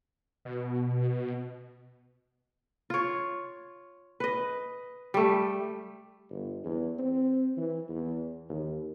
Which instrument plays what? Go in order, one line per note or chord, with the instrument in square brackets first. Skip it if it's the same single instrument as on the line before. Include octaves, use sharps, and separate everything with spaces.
[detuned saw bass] B2
[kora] F4 C#5
B4 D#5
G3 A3
[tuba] G1
E2
C4
E3
E2
D#2